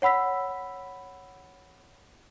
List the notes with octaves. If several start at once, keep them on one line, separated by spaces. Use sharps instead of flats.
C#5 F#5 B5 E6 B6